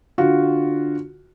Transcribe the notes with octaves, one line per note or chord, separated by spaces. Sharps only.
D3 F4 F#4